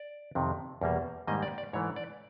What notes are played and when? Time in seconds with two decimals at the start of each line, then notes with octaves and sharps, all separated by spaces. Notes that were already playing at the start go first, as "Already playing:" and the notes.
Already playing: D5
0.35 F2 C3 D#3
0.81 E2 B2 G3 A#3
1.27 G#2 D#3 G3 A#3 D#5
1.43 D5
1.58 D5
1.73 G#2 E3 A3 C#5
1.96 D5